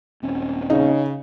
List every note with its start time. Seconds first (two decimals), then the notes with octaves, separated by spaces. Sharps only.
0.22 D#1 C4 C#4
0.70 C#3 D#4